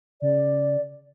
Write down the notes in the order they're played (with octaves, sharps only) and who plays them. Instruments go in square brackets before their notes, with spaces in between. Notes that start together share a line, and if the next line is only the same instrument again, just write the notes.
[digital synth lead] C#3 [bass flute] D5